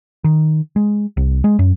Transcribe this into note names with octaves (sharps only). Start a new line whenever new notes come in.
D#3
G#3
C2
G#3
F#2